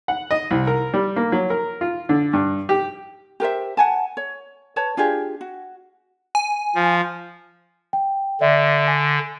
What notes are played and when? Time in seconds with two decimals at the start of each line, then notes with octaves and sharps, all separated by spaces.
0.08 F#5
0.31 D#5
0.51 C2
0.67 A#4
0.94 G3
1.16 A#3
1.32 F#3
1.50 A#4
1.81 F4
2.09 D3
2.33 G2
2.69 G4
3.40 G4 A#4 C5 E5
3.77 F#5 G#5 A5
4.17 C#5
4.76 B4 C#5 A5
4.97 D4 F4 G4 G#4
5.41 F#4
6.35 G#5
6.75 F3
7.93 G5
8.41 D3 D5 E5
8.88 G#5